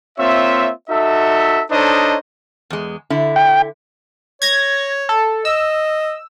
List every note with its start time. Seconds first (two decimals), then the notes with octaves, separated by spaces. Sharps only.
0.18 A#3 C4 F4 C#5 E5
0.89 D#4 F#4 A4 E5
1.71 D4 D#4 A4 C5 C#5 D#5
2.70 E2 G#3
3.10 D3 E4
3.36 G5
4.42 C#5 G#6 A#6
5.09 A4
5.45 D#5 E6